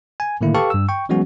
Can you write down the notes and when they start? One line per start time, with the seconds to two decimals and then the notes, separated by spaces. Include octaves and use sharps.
0.20 G#5
0.41 A2 D3 D#3 A3 A#3 E4
0.55 G4 A4 B4 F5 A5 C#6
0.70 G2 E6
0.89 G5 C#6
1.09 E3 F#3 G#3 B3 C#4 F#4